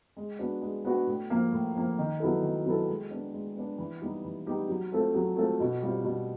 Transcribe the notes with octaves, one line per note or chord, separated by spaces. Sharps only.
G#3
B3 D4 F#4
G#3
B3 D4 F#4
A2
F3 A#3
A2
F3 A#3
D#3
F#3 B3 E4 A4
D#3
F#3 B3 E4 A4
G#3
B3 D4
G#3
B3 D4
E3
G3 B3 D#4 G4
E3
G3 B3 D#4 G4
F#3
A3 C4 F4 A4
F#3
A3 C4 F4 A4
B2
G3 C4 F4
B2